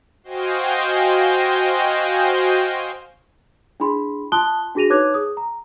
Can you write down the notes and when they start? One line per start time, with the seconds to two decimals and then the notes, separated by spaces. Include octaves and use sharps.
0.24 F#4 C5 D#5 F5 G5 G#5
3.80 D4 E4 G#4 B5 C6
4.32 F4 A5 C6 D#6 F#6 G7
4.75 D4 F#4 G#4 A#6 D#7 F7
4.90 D#4 B4 C#5 D6 F#6 G#6
5.14 G#4 D#6
5.37 A#5